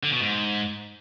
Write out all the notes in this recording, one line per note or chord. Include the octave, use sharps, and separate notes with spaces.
D3
B2
G#2